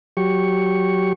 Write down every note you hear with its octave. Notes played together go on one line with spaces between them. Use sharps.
F#3 G4 C#6